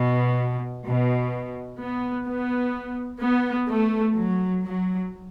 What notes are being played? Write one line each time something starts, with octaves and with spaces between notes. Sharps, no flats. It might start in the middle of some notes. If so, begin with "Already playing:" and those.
Already playing: B2
B2
B3
B3
B3
A3
F#3
F#3